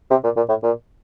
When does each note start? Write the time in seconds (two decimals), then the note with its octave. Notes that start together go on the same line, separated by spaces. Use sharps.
0.10 C3
0.24 A#2
0.37 A#2
0.49 A2
0.63 A#2